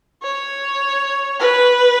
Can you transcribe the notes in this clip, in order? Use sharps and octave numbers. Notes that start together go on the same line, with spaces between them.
C#5
B4